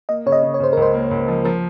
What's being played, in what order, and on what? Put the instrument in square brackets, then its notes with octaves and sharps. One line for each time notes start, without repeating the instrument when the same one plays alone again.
[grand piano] A#3 [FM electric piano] D#5
[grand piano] C#3 [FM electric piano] C#5
[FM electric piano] D#5
[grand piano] C#3
[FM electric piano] C#5
[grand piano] C#3 [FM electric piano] C5
[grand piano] C#2 [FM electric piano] A#4
[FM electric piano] C5
[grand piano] A#3
C#2
F3
[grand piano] F3 [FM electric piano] A#4